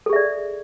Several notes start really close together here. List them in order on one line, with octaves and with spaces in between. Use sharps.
A4 G#4 E5 D5